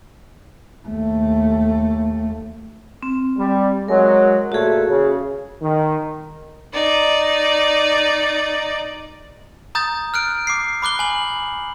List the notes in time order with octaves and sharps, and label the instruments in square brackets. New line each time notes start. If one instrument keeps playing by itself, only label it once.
[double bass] D#2 A3
[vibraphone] C4
[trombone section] G3
[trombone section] F#3 G#3 [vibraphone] A#4
[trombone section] A#2 A3 [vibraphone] F#4 G#4
[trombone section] C#3
D#3
[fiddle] D#4 D5
[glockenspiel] A#5 D#6 G6 A6
F6 F#6 D7
D6 C7
B5 D6 F#6 G7
G#5 F#7